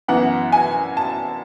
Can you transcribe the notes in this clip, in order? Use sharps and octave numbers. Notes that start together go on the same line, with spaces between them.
F#2 E3 B3 F#5
G#5
A5